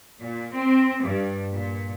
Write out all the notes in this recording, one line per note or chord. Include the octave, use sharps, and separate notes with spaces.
A#2
C4
G2
A#2